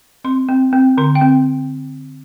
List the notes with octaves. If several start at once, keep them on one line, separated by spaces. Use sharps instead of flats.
C4 C6
C4
C4
D3 C6
G5
C4